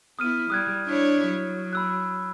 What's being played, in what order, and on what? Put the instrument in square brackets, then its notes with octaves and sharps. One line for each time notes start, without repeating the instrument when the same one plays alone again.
[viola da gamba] B3 E4 [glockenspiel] D#6 F6 D#7
[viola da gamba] G3 [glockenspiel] D#6 F#6 G#6
[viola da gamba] D4 E4 C#5
F#3
[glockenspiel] B5 E6 F#6